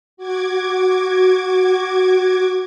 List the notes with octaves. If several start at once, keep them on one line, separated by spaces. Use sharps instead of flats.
F#4 D6 G#6